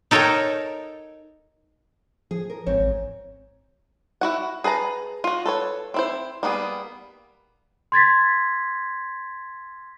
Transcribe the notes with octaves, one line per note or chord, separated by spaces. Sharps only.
D#4 A4 A#4 C#5 D#5 G5
F3 G#4
A#4
A1 G#2 C4 C#5
A1
E4 F#4 F#5
G#4 B4 A5 A#5
F4 F#4
A4 B4 C#5
C4 E4 C5
G3 A#3 B3 G#4
C6 G#6 A6 B6